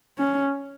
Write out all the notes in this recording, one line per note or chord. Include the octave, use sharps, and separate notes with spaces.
C#4